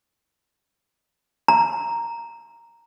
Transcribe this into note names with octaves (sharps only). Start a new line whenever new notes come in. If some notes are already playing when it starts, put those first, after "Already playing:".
A#5